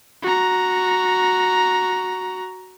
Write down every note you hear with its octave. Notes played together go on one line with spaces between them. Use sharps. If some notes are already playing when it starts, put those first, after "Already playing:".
F#4 A#5